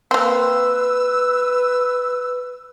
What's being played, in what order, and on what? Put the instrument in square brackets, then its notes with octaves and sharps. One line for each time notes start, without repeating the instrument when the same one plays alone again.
[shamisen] A#3 C4 [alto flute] B4 [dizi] E6